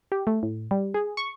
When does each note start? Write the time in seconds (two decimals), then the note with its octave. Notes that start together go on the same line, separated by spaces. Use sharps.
0.12 G4
0.27 A3
0.43 A2
0.71 G3
0.94 G#4
1.17 C#6